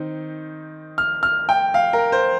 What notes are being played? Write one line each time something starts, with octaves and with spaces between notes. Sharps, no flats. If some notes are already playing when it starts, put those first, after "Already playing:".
Already playing: D#3 C4 D#4
F6
F6
G5
F5
A#4
C5